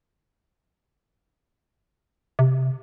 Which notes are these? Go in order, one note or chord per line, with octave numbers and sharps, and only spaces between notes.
C3